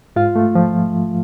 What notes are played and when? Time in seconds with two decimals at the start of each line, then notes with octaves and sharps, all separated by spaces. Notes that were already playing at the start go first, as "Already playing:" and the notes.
0.16 G#2 F4 F5
0.36 A3
0.55 F3